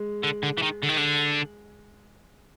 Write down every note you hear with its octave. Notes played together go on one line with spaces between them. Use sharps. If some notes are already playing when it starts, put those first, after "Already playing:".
Already playing: G#3
D3
D3
E3
D#3
D3
D#3
D3